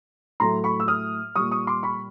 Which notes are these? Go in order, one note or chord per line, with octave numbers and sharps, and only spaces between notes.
A2 F#3 A3 A#5 C6
B5 C#6
E6
D#6 F6
A#2 G3 C#6 D#6
C#6 D#6
C6 D6
B5 C#6